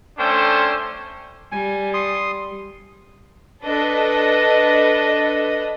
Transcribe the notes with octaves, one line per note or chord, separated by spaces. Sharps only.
A3 C#4 D4 A4 C5 G5
G3 G#5
C6 D#6
D4 A4 B4 D#5